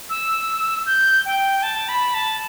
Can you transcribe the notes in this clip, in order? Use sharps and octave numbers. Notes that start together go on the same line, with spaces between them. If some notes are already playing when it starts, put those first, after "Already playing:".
E6
G6
G5
A5
B5
A5